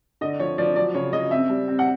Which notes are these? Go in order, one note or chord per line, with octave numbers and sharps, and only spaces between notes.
D3 D#5
F3 C#5
F3 D5
F#3 D5
C#3 C#5
C#3 D#5
C4 E5
G3
C4
F#5